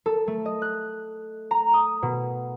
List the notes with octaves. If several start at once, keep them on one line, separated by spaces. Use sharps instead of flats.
A4
A3
D#5
F#6
A#5
D#6
B2